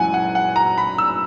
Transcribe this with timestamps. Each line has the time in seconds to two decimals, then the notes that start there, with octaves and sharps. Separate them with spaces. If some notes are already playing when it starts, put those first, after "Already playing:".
Already playing: F#1 F#2 E3 G#3 F#5 G#5
0.14 F#5
0.35 F#5
0.56 A#5
0.78 B5
0.98 E6